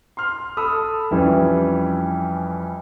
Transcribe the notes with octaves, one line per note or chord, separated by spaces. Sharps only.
C6 F6
A4 B5 D#6 E6
F2 E3 G3 C#4